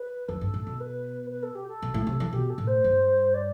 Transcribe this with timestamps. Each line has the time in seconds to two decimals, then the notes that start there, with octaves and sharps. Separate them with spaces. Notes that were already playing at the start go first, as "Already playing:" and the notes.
Already playing: B4
0.28 F2 A4
0.41 G2
0.54 A2
0.67 B2
0.80 B4
1.30 B4
1.43 A4
1.55 G4
1.68 A4
1.82 B2
1.94 A2
2.07 C3
2.20 E3
2.33 B2 G4
2.50 A4
2.58 A2
2.67 C5
2.84 G2
3.34 D5